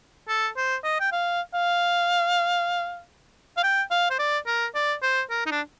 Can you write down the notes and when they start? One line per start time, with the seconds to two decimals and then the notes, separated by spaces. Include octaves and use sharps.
0.28 A4
0.57 C5
0.84 D#5
1.00 G5
1.12 F5
1.54 F5
3.57 F5
3.63 G5
3.91 F5
4.10 C5
4.19 D5
4.47 A#4
4.75 D5
5.02 C5
5.30 A#4
5.46 D#4
5.52 D4